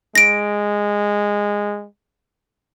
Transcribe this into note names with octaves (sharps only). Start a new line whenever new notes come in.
G#3 A#6 D7